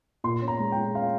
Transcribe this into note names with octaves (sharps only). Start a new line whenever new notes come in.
A#2 C6
C#4
A#5
G#3
G5
G#3
C#4 F5